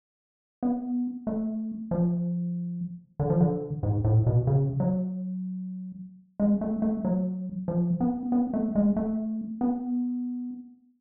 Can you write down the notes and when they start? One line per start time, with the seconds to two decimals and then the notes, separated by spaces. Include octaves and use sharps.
0.63 B3
1.27 A3
1.91 F3
3.20 D3
3.30 F3
3.41 D3
3.83 G#2
4.05 A2
4.27 B2
4.47 C#3
4.80 F#3
6.40 G#3
6.61 A3
6.82 A3
7.05 F#3
7.68 F3
8.01 B3
8.32 B3
8.54 A3
8.75 G#3
8.96 A3
9.61 B3